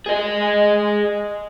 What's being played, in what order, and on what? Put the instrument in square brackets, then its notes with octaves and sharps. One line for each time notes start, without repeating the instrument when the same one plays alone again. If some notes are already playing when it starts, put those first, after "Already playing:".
[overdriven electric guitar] G#4 D#5